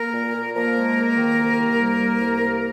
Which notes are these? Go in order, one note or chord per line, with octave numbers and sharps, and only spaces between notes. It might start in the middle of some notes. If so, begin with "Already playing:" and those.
Already playing: A#3 A#4
A#2
A#2
F3 A#3 A#4
G#3
C#2
D#3
C2
C2
G3
C2
C2
A#3